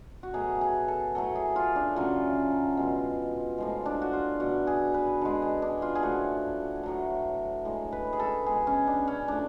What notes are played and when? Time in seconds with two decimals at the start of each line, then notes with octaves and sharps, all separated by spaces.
0.23 F#4
0.34 B2 F#3 A3 G#4
0.61 G#4
0.88 A4
1.15 A2 F#3 A3 A4
1.35 G#4
1.56 F4
1.76 D4
1.96 C#3 F#3 A3 F4
2.77 B2 G#3
3.58 A2 F3 G#3
3.86 D4
4.02 F#4
4.13 F4
4.40 B2 A3 F#4
4.67 G#4
4.94 B4
5.21 D3 G#3 A4
5.42 G#4
5.62 D4
5.82 F4
5.95 G#4
6.02 A2 F3 A3 F#4
6.83 A2 F#3 A3
7.65 A2 G#3
7.92 B4
8.13 G#4
8.20 A4
8.46 B2 G#3 G#4
8.67 C#4
8.87 D4
9.08 C#4
9.28 A2 F3 A3 D4